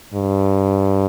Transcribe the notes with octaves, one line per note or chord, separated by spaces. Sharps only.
G2